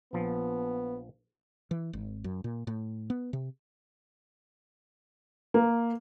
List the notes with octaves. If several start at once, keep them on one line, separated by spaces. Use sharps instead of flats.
A#1 F3 B3
E3
G#1
F#2
A#2
A2
B3
C3
A#3